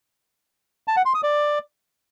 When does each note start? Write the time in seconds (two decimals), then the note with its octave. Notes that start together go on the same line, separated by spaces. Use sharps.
0.88 A5
0.97 F#5
1.06 C6
1.14 D#6
1.23 D5